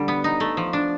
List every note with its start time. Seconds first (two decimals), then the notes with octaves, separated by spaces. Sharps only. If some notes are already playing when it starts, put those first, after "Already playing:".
Already playing: D3 G3
0.08 B3
0.24 D#4
0.40 A3
0.57 F3
0.73 D4